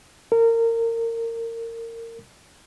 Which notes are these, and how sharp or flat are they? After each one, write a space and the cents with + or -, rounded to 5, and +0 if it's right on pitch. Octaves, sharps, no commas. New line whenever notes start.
A#4 -25